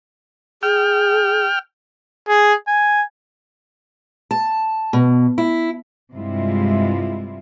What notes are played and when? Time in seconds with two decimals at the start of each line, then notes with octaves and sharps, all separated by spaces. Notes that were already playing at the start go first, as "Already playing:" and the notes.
0.63 G#4 G5 F6
2.28 G#4
2.68 G#5
4.31 A5
4.93 B2
5.38 E4
6.11 G2 C3 G3 G#3 E4 F4